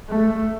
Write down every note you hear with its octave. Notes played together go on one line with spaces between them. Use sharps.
A3